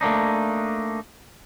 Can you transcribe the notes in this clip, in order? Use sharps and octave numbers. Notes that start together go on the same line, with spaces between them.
A3 A#3 D4 D#4